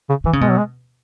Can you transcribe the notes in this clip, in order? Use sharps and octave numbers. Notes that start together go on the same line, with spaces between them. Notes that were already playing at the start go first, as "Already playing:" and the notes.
C#3
D#3 E3
C#3
B2 G#3
F#3
G#3